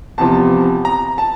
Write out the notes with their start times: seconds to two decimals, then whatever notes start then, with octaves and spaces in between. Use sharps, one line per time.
0.18 E2 C3 F3 A5
0.85 A#5
1.18 A5